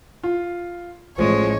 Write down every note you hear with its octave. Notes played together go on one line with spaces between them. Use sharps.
F4
A1 F3 G#3 C#5